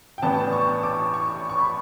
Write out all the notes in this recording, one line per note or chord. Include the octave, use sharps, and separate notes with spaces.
G5
A1 A2 E3 B3 D4 A5
C#6
D6
C#6
C#6
B5